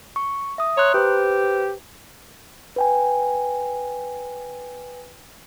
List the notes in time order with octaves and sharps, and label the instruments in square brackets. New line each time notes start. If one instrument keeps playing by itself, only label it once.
[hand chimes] C#6
E5 D#6
[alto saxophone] C#5 [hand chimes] A#5 C6 F#6
[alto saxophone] G4 [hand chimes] B4 C5
[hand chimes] B4 G5 G#5